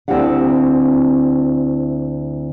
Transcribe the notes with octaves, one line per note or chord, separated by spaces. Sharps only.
D2 C4 E4 G4 F5 F#5